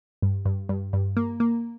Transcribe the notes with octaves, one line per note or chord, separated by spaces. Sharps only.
G2
G2
G2
G2
A#3
A#3